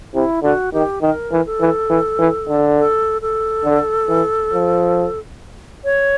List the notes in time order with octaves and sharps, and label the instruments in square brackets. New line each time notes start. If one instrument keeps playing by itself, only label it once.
[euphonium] C3 [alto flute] E4
[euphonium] D3 [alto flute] F#4
[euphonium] D#3 [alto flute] G4
[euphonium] D#3 [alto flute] A#4
[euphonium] E3
[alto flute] A4
[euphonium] E3
E3
E3
D3
[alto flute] A4
A4
[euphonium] D3
E3
F3
[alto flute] C#5